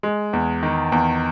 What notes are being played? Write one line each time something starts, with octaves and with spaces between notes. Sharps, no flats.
G#3
E2
D#3
E2